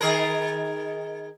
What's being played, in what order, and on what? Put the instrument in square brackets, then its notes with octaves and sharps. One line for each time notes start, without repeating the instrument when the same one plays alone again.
[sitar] D#3 G#4 A#4